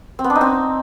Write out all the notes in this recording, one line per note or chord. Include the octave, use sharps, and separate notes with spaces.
C4
B3
D4
D#4
C4